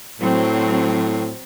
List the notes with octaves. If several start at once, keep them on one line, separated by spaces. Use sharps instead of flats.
A2 F#3 C4